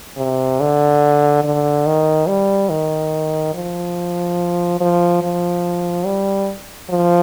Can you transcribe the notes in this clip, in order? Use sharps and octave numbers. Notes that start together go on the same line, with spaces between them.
C3
D3
D3
D#3
G3
D#3
F3
F3
F3
G3
F3